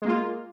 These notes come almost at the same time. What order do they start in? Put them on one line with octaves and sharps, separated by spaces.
G#3 A#3 F4